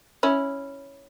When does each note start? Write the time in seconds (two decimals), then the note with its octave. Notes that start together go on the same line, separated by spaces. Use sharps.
0.23 C#4 E4